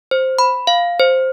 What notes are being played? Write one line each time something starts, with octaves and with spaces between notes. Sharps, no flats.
C5
B5
F5
C5